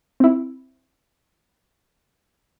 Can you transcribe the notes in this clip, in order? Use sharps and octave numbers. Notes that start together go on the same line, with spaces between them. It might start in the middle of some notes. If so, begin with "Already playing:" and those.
C4 E4